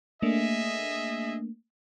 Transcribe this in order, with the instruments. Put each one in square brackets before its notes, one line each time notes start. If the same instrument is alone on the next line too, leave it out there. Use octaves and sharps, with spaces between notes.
[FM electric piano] A3 A#3 D4 [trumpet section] G#4 D#5 E5